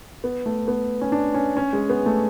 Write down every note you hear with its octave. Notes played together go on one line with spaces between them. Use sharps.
B3
A3
B3
C#4
D4
C#4
C#4
G#3
B3
A3